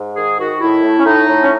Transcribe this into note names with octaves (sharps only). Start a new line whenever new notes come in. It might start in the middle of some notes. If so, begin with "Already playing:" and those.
Already playing: G#2
D#3 G#4
D#3 F#4
A2 E4
A2
C#4
A2 D#4
A2
C#4